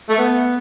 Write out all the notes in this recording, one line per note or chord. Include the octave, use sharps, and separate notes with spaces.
A3
B3